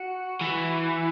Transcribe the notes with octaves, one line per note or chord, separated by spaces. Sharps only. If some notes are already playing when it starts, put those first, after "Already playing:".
Already playing: F#4
E3